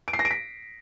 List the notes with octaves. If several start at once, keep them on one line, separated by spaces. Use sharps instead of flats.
D7
C7
A#6
D7
B6